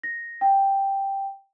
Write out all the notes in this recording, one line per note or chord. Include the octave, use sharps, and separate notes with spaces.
A#6
G5